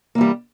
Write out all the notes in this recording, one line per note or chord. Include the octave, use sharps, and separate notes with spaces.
E3 G3 A#3